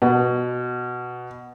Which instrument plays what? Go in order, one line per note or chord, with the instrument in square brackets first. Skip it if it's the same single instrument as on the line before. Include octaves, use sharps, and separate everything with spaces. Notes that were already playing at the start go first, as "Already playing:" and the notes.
[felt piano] B2